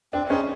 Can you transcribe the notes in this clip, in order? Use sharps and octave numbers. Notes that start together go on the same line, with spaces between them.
C4 D4
C#4 D#4 G#4 C5